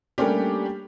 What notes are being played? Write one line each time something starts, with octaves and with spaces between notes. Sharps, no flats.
G3 A3 A#3 C#4 D4 G4